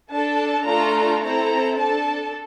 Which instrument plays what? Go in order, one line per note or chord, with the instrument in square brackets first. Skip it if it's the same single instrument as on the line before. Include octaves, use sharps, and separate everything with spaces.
[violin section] D4 A4 A5
A3 D4 F4 A4 A#5
C4 E4 A4 A#5
D4 A4 A5